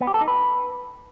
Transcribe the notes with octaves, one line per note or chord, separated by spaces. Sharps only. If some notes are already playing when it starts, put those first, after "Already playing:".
B3
G4
A4
D#4
B4